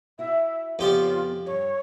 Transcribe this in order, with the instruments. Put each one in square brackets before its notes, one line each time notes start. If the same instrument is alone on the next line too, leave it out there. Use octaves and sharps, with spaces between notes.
[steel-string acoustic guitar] E4 F#4 [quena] E5
[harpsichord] F2 G4 D5 [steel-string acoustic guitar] C#3 B3 C#5 [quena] F4
[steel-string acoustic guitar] G2 [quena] C#5